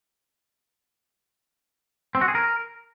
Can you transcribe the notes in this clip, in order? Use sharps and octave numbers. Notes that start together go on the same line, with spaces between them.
C4
F#4
G#4
A#4